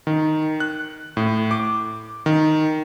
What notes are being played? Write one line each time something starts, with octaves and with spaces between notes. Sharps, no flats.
D#3
F#6
A2
D6
D#3